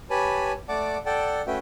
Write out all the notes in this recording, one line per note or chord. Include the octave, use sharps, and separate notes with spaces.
G4 B4 C#5 G#5 A5 B5
A3 D5 F#5 A5 D6
A4 D5 F#5 G5 A5
A3 C#4 F#4 B4 E5 G5